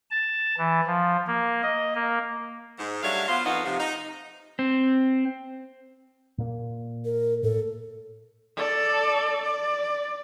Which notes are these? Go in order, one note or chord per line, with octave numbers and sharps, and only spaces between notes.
A5
E3
F3
A#3
D#5
A#3
G#2
F#3 G3 A3 D4 C#5 F5
B3 F4 C5
F2 F3 A#3 B3 D#4 F#4
C3 F3
D#4
C4
A#2 A#3
A#4
A2 A4
A4 D5
D5